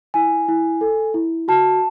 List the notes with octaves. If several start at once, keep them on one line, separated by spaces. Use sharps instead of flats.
E4 G#5
E4
A4
E4
F#4 A5